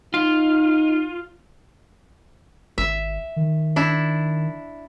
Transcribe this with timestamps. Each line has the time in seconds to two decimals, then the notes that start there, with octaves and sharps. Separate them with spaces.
0.14 D#4 F4
2.78 G#1 E5
3.36 D#3
3.76 D4 E4